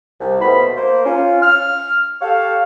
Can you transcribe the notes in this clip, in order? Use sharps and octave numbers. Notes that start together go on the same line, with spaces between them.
C2
D#2 B2 A3 B3 C5 B5
A#3 C5
C#4 F4
F6
G4 A4 C#5 F5